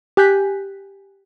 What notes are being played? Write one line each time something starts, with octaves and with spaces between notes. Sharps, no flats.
G4 G#5 F#6 G6 B6